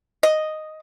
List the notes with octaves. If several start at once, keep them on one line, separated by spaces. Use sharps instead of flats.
D#5